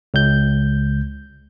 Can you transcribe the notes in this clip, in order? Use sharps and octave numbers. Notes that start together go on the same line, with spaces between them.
C#2 G6